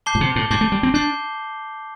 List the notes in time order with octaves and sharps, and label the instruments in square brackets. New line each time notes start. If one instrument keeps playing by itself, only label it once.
[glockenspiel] A5 D6 G6 C7 G7
[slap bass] A2
C3
A2
[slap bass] G2 [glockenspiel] A5 D6 G6 C7 G7
[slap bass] A3
G3
C4
[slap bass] D4 [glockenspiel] A5 D6 G6 C7 G7